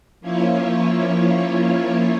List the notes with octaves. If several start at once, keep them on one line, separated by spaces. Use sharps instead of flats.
F3 A#3 C#4 E4 F4 C#5